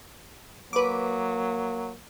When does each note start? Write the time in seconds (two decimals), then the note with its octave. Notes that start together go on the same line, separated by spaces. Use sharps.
0.73 F#3 A#3 B4 D6